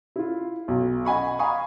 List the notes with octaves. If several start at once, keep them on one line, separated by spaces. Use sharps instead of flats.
E4 F4
B1
D#5 F#5 G#5 B5 C#6
F5 G#5 A#5 B5 C#6 D#6